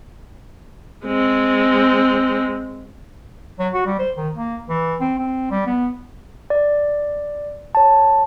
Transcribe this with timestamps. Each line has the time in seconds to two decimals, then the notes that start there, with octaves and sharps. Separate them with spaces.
1.06 G#3 C4
3.59 F#3
3.74 F#4
3.86 G3
3.99 C5
4.17 D#3
4.35 A#3
4.69 E3
5.01 C4
5.18 C4
5.51 G3
5.67 B3
6.50 D5
7.75 C#5 A5